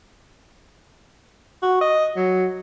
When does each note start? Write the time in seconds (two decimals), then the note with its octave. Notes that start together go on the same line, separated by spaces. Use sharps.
1.63 F#4
1.81 D#5
2.17 F#3